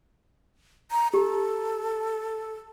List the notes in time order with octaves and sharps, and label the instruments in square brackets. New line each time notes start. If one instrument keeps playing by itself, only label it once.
[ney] A#5
[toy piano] G4 [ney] A4